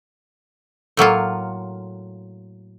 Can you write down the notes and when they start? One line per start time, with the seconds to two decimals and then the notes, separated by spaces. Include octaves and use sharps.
0.97 A2 F#3 A#3 F4